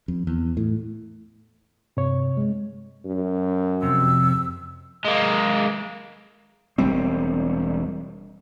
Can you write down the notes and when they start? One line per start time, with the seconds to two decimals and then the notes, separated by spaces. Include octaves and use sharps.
0.08 F2
0.27 E2
0.57 A2
1.97 G2 C3 C#5
2.37 G#3
3.05 F#2
3.82 F2 C3 E6
5.05 G#3 A#3
6.78 E1 G3 C4